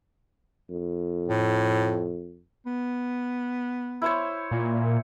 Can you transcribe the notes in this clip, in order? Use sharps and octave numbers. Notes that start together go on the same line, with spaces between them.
F2
A2
B3
E4 C5 C#5
A#2